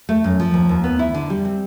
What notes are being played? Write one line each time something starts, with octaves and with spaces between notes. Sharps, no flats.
A3
F#2
F3
D#2
D#2
B3
E4
D3
G3
C4